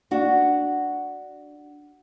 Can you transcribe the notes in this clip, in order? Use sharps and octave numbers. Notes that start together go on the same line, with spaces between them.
D4 F#4